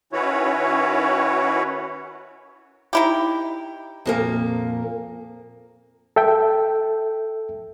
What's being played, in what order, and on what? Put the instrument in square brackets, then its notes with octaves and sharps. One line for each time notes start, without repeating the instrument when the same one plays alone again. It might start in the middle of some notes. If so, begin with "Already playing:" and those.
[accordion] D#3 C#4 E4 F#4 B4 C#5
[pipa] D#4 E4 G4
[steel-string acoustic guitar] F2 A#2 A#3
[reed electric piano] A4 E5 G5